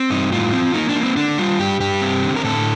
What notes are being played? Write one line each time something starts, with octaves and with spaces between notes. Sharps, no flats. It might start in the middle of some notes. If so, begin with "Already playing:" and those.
Already playing: C4
G2 D#4
A2 F4
C4
A#3 D#4
D4
A#3
C4
D3 D4
G3 F4
G2 G4
G2 G4
C4
D3
A#4
A2 A4